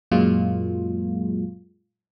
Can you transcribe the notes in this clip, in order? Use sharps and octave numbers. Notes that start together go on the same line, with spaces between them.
F#2 A#2 F#3 G#3 A#3 F4